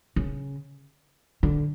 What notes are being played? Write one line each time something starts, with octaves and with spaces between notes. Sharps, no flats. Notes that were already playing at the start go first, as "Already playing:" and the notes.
C#3
D3